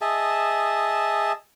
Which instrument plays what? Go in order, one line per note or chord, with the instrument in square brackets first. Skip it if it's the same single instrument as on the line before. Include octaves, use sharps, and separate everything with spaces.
[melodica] G#4 D#5 E5 A5